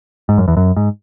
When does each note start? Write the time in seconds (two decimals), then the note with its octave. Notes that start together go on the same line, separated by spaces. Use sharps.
0.29 G#2
0.38 F#2
0.48 E2
0.57 F#2
0.77 G#2